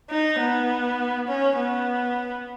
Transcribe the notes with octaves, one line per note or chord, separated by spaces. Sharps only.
D#4
B3
C#4
B3